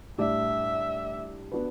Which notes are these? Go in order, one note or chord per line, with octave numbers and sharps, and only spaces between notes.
A2 G3 D4 G4 D5 E5
B3 D4 F#4 B4